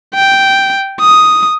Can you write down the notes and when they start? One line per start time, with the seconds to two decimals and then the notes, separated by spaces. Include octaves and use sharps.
0.15 G5
1.01 D#6